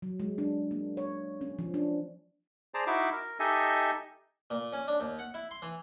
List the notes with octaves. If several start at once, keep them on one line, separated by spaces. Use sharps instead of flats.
F#3
G#3
D4
A#3
C#5
C#4
F3
D4
G#4 C5 D5 A5 A#5
D#4 E4 F#4 E5 D6
A#4
D#4 G4 A4 D#5 E5 G#5
A#2
C#4
D4
D#2
F#5
E4
C6
E3